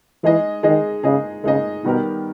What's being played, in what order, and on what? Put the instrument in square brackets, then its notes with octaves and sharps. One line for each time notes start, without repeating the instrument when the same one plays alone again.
[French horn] E3 [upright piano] G#3 D#4 G#4 D#5
[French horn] D#3 [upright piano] G#3 D#4 G#4 D#5
[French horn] C#3 [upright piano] G#3 D#4 G#4 D#5
[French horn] C#3 [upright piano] G#3 D#4 G#4 D#5
[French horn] B2 [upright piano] D#3 G3 B3 G4 A#4